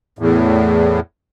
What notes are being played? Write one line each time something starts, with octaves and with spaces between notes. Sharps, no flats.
E2 A2